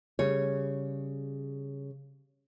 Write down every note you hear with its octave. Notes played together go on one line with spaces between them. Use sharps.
C#3 G3 C#5